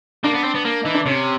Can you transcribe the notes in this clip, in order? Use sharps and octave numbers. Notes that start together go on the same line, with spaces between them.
A#3 D4
B3
C4
B3
A#3
E3 D#4
D4
C3 C#4